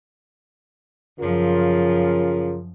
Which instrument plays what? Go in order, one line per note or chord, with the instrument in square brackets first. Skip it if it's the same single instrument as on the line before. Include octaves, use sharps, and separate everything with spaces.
[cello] F#2 F3 [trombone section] C#3 F4 A#4